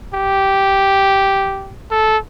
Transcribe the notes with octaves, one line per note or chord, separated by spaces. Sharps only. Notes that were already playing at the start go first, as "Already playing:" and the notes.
G4
A4